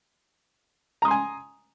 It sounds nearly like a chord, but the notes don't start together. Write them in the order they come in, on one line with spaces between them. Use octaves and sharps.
A#5 D#6 C6 G#5